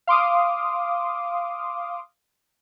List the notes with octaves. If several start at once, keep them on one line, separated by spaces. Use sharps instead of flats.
F5 C6 D6 D#6